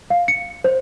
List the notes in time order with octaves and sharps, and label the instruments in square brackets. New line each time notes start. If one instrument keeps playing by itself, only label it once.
[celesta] F5
C#7
C5